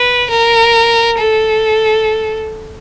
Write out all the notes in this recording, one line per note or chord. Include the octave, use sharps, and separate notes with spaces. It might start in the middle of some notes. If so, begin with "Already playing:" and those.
Already playing: B4
A#4
A4